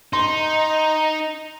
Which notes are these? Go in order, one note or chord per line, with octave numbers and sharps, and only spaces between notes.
D#4 C6